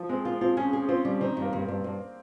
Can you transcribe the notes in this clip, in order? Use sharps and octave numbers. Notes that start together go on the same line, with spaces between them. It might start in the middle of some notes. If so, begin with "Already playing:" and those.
Already playing: F3
G#3 C4
A#3 F4
C4 F4
C#4 G#4
G#4
C4 F4
G3
D#3 C4
G2
A#3
G2
A#3
G2
G2